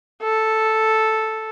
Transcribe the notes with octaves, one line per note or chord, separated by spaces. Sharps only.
A4